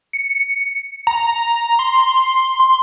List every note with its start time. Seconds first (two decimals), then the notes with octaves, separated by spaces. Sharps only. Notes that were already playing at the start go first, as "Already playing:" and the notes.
0.13 C#7
1.07 A#5
1.79 C6
2.60 C6